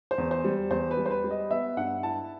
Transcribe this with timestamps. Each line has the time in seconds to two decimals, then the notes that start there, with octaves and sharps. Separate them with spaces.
0.11 C5
0.18 E2
0.31 C5
0.44 G3
0.71 E2 C5
0.91 B4
0.97 G3
1.06 C5
1.10 B4
1.24 G3
1.31 D#5
1.51 B3 E5
1.77 G2 F#5
2.03 E4 A5